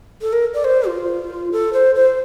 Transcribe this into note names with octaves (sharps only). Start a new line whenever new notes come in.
A4
A#4
D5
C5
F4
A4
C5
C5